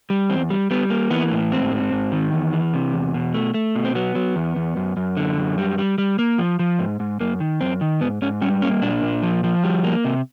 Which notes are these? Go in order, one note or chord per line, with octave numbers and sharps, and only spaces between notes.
G3
E2 C4
G3
G3 B3
A#3
E3 B3
A2
G#2 C4
G#2
G#2
D#3
E2
E3
C3
E2
B2
A3
A3
B2
C4
F#3 B3
F#3
E2
E2
F#2
F#2
D3
F#2
G3
G3
G3
A#3
F3
F3
G#2
G#2
F#2 A#3
D#3
F#2 C4
D#3
G#2 B3
G#2 C#4
G3 C#4
A#3 C#4
A#2 D4
A#2
F3
F3
G3
A#3
C3